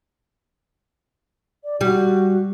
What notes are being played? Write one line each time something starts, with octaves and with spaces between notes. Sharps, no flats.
D5
G3 F#4